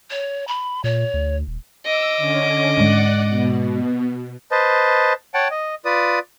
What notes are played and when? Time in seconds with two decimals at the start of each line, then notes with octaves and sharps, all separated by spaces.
0.11 C#5
0.48 B5
0.84 A#2 C#5
1.14 D2
1.47 D#1
1.85 D#5 D6 E6
2.17 D3 C#4
2.77 G#2 G#3 D5 F#5
3.29 B2
4.51 B4 C5 D#5 A5
5.34 C#5 F#5 G5 A5
5.51 D#5
5.85 F4 B4 D5 D#6